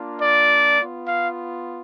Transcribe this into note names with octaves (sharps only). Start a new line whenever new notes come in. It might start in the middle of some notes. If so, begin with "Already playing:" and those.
Already playing: A#3 D4 F4
D5
B3 F4
F5